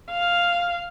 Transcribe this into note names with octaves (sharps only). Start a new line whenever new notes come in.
F5